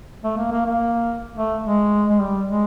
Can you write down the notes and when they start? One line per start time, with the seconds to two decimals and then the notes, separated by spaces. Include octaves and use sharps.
0.24 A3
0.37 A#3
0.52 A#3
0.66 A#3
1.36 A3
1.64 G#3
2.09 G#3
2.20 G3
2.49 G#3